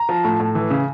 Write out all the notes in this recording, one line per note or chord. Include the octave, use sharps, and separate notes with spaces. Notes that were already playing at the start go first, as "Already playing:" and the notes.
Already playing: A#5
F3
A2
A2
E3
C#3